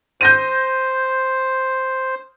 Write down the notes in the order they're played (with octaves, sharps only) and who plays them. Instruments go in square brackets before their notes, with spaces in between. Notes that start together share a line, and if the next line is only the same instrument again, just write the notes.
[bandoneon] C5 [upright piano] G6 A#6 D#7